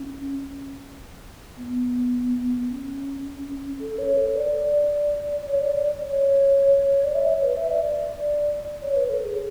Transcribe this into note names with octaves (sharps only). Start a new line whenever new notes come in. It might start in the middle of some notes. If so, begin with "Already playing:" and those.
Already playing: C#4
B3
C#4
A4
C#5
A4
D5
C#5
D5
D5
C#5
D5
E5
C#5
B4
E5
D5
C#5
B4
A4
G#4